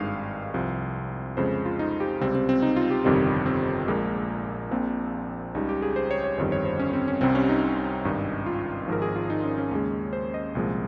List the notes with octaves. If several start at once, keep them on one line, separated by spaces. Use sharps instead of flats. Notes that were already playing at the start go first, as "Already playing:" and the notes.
Already playing: G#1 G2 D#3 G#3 F5
C2 C3 F3
F2 C#3 G#3 C5
F4
D#4
G4
C#2 C3 G3 C4
C4
C4
D#4
F4
G4
G1 F2 C3 D#3 G3
C4
A#1 A#2 G#3 A#3
A#1 A#2 F3 C4
C#2 C#3 G3 D#4
G4
G#4
C5
C#5
C#5
G1 F2 D#3 G3 C5
C#5
C5
C#4
C4
C#4
C2 C3 G3 C4
C#4
D#4
G#1 G2 D#3
F4
G#1 G#2 F3 A#4
G#4
F4
D#4
C#4
C#4
D#2 C#3 G#3
C5
D#5
C2 A#2 F3 G#3